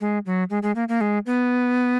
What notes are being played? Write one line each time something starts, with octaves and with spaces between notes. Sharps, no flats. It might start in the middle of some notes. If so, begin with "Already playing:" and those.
G#3
F#3
G#3
G#3
A#3
A#3
G#3
B3